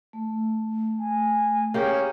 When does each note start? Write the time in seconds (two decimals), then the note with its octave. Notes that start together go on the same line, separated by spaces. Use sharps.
0.13 A3
0.99 G#5
1.74 A#3 C#4 G4 G#4